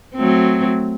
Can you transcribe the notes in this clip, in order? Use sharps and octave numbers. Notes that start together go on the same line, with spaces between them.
F#3 A3 C4